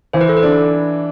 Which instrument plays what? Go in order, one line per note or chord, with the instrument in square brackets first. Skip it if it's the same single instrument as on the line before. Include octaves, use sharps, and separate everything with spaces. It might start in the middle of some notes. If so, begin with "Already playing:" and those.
[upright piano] E3 [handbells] C5
[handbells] B4
A4
B4
[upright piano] D4